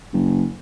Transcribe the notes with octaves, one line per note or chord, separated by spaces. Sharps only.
F#1